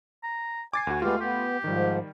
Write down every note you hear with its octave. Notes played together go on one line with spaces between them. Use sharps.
A#5
G#5 D6 A6 C7
D2 F#4
G#3 A3 B3 F4 G4 F5
B3 G4
G#2 D#3 F3 G3